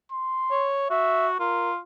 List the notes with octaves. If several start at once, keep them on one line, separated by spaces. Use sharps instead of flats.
C6
C#5
F#4 E5
F4 A#4